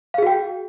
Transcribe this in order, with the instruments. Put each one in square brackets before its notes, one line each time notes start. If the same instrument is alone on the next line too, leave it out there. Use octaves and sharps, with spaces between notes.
[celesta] F5
G#4
F#4
G5